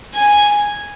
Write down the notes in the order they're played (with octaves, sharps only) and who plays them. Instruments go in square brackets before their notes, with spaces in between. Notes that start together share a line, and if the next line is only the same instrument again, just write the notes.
[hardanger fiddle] G#5